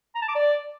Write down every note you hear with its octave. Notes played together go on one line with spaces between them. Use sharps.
A#5
A5
D6
D5